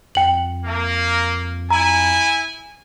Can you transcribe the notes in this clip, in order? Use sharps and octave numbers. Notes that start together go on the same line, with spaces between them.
F2 G5 F#7
A#3
E4 G#5 A#5